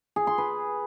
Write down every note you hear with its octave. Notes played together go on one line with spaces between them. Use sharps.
G#4
C6
B4